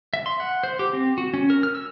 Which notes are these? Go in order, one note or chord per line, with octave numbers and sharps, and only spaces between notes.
E5
C6
F#5
C5
G4
C4
F#4
C#4
A#4
F6
E6